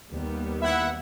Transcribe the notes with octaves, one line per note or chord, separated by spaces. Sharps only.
D#2 G3 B3
E4 E5 F#5